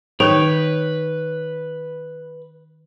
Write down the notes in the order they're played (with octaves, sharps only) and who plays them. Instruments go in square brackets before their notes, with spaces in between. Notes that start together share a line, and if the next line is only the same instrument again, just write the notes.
[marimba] D#3 D#4 [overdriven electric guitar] B4 [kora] C#5 G5